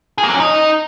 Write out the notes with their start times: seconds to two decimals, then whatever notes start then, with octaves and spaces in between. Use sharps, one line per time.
0.18 G#4
0.24 A#3
0.29 F#3
0.34 C#4
0.40 D#4